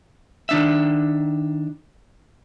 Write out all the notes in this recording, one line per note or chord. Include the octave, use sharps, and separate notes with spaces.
D#3 D4 E5